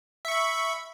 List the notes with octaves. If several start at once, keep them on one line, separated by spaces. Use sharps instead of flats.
E5 B5 C#6